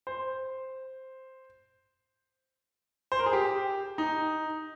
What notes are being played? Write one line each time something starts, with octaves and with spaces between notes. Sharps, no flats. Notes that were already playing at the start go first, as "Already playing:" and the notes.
C5
C5
A#4
G#4
G4
D#4